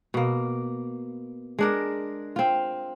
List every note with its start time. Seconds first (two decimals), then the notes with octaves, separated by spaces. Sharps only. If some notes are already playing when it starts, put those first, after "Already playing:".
0.14 B2 A#3
1.59 G#3 D4 A#4
2.36 C4 F4